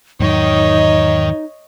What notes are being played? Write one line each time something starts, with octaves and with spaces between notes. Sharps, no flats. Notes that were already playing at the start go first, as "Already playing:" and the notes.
E2 G#2 D#3 F#3 D#4 C#5 D#5